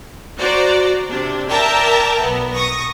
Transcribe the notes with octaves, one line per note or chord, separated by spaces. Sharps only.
F#4 C5 D5 A#5
C3 D4
A#4 D5 E5 G5 A5 A#5
B1 B3
C#6 D#6 A#6